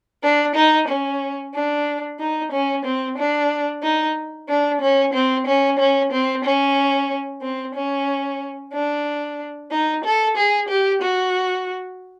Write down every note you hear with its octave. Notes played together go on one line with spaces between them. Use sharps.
D4
D#4
C#4
D4
D#4
C#4
C4
D4
D#4
D4
C#4
C4
C#4
C#4
C4
C#4
C4
C#4
D4
D#4
A4
G#4
G4
F#4